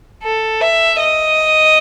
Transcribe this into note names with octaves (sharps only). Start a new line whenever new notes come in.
A4
E5
D#5